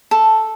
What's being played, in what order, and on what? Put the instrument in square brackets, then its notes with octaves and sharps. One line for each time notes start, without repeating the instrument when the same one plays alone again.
[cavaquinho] A4